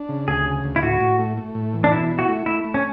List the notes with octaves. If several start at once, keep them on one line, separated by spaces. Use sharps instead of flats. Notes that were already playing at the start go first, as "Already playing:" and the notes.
Already playing: D4
C#3
D2 G#4
C#3
D2
E4
A2 F#4
A2
A3
A3
A2
E3
D4
B2 E4
E4
F#4
A3
A3 E4
A3
C#4